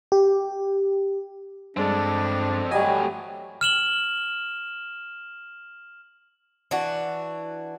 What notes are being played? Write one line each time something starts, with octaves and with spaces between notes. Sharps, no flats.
G4
G2 G#3 C4 D4 A4
F#3 G3 A3 C#5 D#5 G#5
F6 E7 F#7 G7
E3 D4 F#4